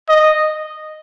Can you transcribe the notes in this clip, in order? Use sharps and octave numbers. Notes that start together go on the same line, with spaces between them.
D#5